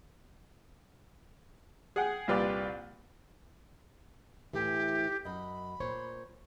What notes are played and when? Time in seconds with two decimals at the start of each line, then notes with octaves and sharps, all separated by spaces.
1.96 G#4 F#5 G5
2.28 C2 A#2 F4 G4 B4 D5
4.53 A2 E3 G4
5.25 F#2 D#5 B5
5.80 A#2 C5 C#5